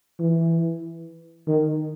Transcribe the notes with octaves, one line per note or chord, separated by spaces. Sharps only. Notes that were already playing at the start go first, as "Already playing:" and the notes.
E3
D#3